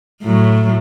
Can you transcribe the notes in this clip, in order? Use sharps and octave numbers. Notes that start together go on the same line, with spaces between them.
A2 F#3